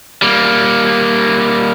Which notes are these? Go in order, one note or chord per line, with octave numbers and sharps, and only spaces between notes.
G3 A#3